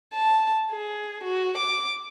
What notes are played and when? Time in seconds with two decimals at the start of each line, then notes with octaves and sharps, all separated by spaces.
0.13 A5
0.71 G#4
1.24 F#4
1.57 D6